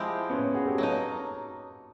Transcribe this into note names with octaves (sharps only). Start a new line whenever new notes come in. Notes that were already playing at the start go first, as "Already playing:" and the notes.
Already playing: F3 G#3 C4 E4 G4
B3 C#4
F#4 G#4
G4 A4
F#3 A#3 D#4 A4 B4